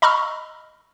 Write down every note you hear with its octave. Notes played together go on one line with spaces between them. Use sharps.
D#5 A#5 B5 C#6 E6 F6